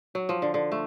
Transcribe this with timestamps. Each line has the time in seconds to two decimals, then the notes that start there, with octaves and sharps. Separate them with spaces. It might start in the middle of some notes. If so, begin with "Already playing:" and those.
0.15 F#3
0.29 F3
0.42 D3
0.54 D3
0.72 A3